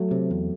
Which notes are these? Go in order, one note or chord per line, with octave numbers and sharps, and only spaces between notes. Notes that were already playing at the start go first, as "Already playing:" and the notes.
Already playing: F#3 A3
C3
E2